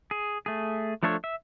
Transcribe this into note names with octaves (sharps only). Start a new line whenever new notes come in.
G#4
A3 G#4
F3 A3 D4 A4 C#5
E5